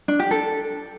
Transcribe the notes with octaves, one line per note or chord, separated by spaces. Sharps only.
D4
G4
A4